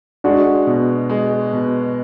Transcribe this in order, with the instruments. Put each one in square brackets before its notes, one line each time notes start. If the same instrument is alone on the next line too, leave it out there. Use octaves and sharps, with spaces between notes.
[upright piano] G#3 [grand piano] D4 F#4
[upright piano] B2
G#3
B2